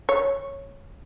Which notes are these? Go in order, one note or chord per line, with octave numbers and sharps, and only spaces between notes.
C#5